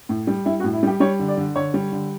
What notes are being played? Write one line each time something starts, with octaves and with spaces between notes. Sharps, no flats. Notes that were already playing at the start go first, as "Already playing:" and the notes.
A2
G3
G3 E4
F#4
A2
E4
G3 G4
G3 C#5
D3
D5
D3
D3 C#5
G3
D3